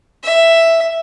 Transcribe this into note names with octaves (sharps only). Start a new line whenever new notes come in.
E5